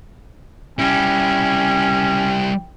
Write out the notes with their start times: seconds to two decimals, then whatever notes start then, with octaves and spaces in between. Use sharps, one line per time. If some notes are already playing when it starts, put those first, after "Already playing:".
0.79 G3 C#4 E4 G5